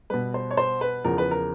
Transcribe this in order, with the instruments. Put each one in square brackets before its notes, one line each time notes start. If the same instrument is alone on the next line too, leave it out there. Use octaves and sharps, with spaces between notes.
[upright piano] B2 G3 B4
C5
C#5
C5
B4
E2 C#3 F3 A#4
B4
A#4